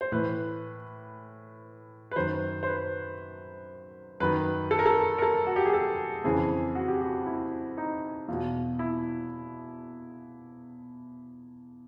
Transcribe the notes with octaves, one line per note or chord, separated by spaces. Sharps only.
C5
A2 E3 B4
B4
F#2 D#3 C5
C5
B4
F#2 D#3 B4
A4
A#4
A4
A#4
A4
F#4
G4
G#4
A4
F2 C#3 E3 G#4
F#4
G4
F#4
E4
D#4
E2 B2 F4
E4